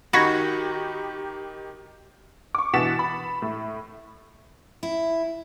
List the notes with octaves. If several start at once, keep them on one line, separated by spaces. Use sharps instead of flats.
D#3 D#4 F#4 G4 B5 C#6 G#6 A#6
C#6 D6
B2 E3 F#5 A6 B6 E7
B5
A2
E4